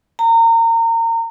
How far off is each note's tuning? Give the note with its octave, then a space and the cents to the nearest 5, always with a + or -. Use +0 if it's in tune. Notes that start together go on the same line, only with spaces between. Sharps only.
A#5 -30